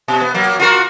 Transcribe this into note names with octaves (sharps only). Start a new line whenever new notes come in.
B2
B3
F#3 A#3
F4 F#4 A#4